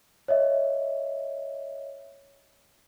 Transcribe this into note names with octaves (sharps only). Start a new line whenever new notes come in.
C#5 D#5 E5